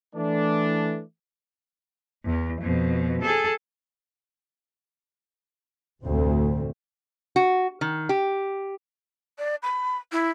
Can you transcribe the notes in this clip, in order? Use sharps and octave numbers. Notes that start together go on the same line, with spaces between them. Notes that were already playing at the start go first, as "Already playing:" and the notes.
E3 A3 D4
E2
F2 B2
G#4 A4
F1 D2 A2 A3 C4
F#4
D#3
G4
D5
B5
E4